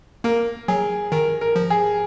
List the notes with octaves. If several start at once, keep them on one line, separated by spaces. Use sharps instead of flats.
A#3 A#4
F#3 G#4
D#3 A#4
A#4
F3
G#4